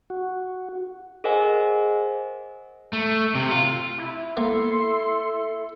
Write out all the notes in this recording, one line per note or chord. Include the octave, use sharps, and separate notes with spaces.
F#4
G#4 A#4 C5 D#5 F#5 G#5
A3
C3
F4
E4
A#3 A4 C6